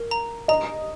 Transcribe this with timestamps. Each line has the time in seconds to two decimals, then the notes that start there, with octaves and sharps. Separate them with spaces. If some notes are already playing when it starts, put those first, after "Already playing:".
Already playing: A#4
0.11 A#5
0.48 D#5 A#5